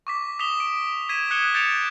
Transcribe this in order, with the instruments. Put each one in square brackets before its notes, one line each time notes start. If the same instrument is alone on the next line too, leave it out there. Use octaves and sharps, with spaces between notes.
[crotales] C#6 D6 B6
D#6 B6 E7 F7 G7
D7
G#6 B6 D#7 E7
D#6 F#6 G#6 C#7 E7 G7
G6 A6 C#7 D7 E7 F7